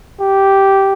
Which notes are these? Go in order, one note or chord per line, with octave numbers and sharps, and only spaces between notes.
G4